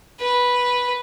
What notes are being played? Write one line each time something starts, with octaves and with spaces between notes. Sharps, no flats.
B4